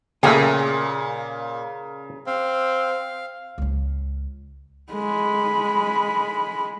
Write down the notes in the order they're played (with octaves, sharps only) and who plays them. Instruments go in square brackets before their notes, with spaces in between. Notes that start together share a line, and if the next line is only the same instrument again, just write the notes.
[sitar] A#2 [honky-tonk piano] C#3 [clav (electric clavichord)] A3 A#3 G4 [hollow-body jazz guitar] C#4 G#4
[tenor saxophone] C4 [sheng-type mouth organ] F5
[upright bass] C#2 C#4
[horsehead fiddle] G#3 B5